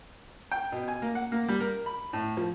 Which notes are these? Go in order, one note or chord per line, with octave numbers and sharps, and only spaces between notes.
G5
B2
G#5
A#3
F#5
A#3
G3
A#4
B5
A2
F3